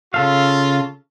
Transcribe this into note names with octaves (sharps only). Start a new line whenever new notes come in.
C#3 F4 A4 F5